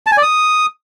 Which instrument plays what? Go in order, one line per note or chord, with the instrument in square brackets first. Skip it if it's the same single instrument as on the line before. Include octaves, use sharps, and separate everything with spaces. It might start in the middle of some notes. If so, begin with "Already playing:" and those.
[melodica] A5
G#5
D5
D#6